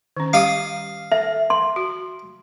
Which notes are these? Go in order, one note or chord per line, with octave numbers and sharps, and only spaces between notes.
D#3 C#4
G3 G4 F5 D6 D#6
A4 E5
C6
F#4